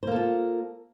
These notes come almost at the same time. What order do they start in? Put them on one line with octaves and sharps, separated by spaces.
C5 A#3 A4 F4